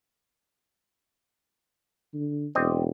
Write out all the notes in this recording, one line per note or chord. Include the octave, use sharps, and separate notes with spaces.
D3
E1 C4 D5 D#5